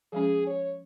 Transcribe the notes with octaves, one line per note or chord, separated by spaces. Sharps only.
F3 G#3 C#4 G#4
C#5